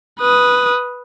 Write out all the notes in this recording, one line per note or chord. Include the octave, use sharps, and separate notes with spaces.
B4 D#6